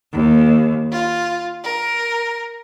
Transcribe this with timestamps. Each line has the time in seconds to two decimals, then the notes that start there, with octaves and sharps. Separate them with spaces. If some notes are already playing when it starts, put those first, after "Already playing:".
0.12 D#2
0.90 F4
1.63 A#4